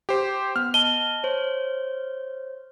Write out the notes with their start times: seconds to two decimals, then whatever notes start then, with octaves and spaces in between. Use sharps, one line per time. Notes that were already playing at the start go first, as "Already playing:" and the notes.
0.09 G4 C5
0.56 B3 F6
0.74 D#5 A5 D#7 G7
1.23 C5 C#5